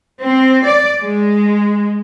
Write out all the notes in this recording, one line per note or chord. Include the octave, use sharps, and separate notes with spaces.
C4
D5
G#3